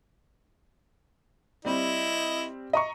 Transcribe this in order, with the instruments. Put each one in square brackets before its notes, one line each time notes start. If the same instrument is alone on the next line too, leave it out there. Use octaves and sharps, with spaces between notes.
[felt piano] G3 C4 [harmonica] E4 D#5
[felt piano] D#5 A#5 C#6